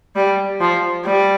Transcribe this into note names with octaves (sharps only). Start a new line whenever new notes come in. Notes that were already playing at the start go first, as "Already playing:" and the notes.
G3
F3
G3